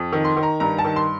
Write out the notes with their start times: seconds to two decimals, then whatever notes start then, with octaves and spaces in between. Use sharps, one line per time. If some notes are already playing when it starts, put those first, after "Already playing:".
Already playing: F2
0.13 D#3
0.25 C6
0.37 D#3
0.43 A#5
0.60 G2 A#5
0.78 A5
0.85 D#3
0.96 C6